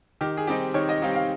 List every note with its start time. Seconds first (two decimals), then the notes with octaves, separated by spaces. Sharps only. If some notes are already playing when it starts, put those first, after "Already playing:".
0.21 D#3 G4
0.37 G#4
0.47 G3 C4 D#4 G4
0.74 D#3 C#5
0.89 D#5
1.02 G3 C4 D#4 F5
1.15 F5